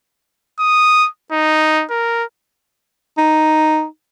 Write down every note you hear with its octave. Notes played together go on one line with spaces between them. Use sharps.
D#6
D#4
A#4
D#4